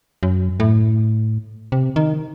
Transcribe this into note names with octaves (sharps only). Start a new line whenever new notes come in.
F#2
A2
C3
D#3